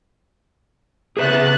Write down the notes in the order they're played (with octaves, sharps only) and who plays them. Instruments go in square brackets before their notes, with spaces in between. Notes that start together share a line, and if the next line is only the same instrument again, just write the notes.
[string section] C#3 F#6 A6 [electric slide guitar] G#4 B4 E5